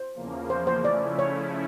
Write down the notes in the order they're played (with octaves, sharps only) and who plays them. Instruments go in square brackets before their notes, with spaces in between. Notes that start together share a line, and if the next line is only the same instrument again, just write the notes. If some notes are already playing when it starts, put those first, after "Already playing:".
Already playing: [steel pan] C5
[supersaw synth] E2 C#3 F3 A#3
[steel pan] C5
C5
[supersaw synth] C#3 F3 A3 C#4 E4 [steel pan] D5
[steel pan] C#5